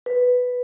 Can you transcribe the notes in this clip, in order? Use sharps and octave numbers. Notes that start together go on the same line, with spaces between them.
B4